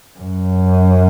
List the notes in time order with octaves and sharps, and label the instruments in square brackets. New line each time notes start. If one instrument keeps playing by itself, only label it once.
[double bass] F#2